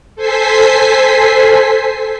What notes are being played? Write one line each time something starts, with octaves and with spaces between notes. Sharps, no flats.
A4 C5 G#5 B6 C7